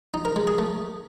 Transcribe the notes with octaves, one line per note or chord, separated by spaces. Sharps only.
D#4
A#4
G#3
G#4
A3